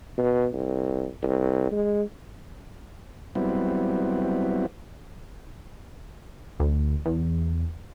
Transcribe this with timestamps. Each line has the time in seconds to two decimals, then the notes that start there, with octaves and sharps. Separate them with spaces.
0.18 B2
0.53 C2
1.23 C2
1.72 G#3
3.35 F#3 G3 B3 C4 E4
6.60 D2
7.06 E2